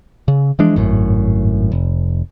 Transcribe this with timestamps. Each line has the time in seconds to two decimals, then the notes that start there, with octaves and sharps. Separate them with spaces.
0.28 C#3
0.59 E3 F3 G#3 D4
0.76 G#1 F#2 A2
1.72 F1